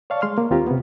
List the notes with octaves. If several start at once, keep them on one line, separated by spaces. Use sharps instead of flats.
C#5 D5 F5 A5 C#6
G#3 C6 F6
A#3
D#2 C4 F4 G4 A#5
C3 B3